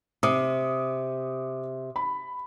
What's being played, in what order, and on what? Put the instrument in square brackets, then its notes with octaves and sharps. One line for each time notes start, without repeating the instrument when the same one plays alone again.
[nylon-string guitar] C3 [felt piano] D6 D#6
[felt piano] B5